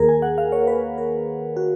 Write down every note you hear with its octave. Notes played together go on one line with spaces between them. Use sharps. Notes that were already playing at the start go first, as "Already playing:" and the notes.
Already playing: D#2 D#3 A#3 G#4 A#4
G#5
F#5
F5
C#5
B4
A#4
F#4